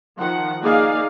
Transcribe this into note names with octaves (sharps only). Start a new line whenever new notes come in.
D#3 F3 F#5
A#3 D#4 G#4 D5 F5